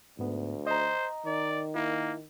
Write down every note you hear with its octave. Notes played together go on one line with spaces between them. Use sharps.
D2 G#2 B3
C5 D#5 A#5
D#3 D5
A#3 E4